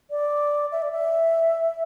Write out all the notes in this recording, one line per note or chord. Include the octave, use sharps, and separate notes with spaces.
D5
E5
D5
E5